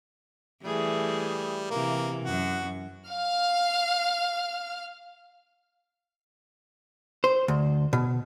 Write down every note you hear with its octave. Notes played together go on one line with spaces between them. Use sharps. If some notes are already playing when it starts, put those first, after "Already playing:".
E3 G3 A3 G#4
C3 E3 A#3
F#2 F#4
F5 F6
C5
D2
B2